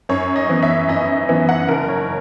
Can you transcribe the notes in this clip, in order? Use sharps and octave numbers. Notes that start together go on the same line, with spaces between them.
F#2 C#5
D#5
E3 B3
E5
F#2 D#5
D#5
E3 B3 E5
F#5
F#1 A#4
C#5